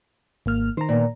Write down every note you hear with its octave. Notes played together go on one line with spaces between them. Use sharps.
G#1 A#3 F6
D#3 C5 A#5
A#2 B3